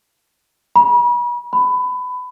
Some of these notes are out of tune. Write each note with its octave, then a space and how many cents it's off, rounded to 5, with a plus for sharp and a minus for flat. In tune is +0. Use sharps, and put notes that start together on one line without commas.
B5 -40
B5 +20